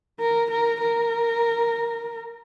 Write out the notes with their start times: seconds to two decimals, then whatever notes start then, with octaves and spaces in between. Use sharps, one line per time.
0.20 A#4
0.50 A#4
0.82 A#4